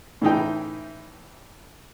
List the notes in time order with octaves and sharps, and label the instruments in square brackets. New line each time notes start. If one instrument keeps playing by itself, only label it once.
[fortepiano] A2 E3 D#4 G5